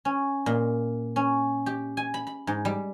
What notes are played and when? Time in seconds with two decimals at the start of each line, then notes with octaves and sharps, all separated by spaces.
0.05 C#4
0.46 A#2
1.16 C#4
1.66 G4
1.97 G#5
2.14 B5
2.27 B5
2.47 G#2
2.65 G3